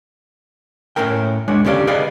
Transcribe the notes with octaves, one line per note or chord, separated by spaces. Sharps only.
A2 A3 C#4 A#4 G5
G#3 D4 C#5
D3 C#4 G4 D5 F5
G#4 B4 D5 D#5 F5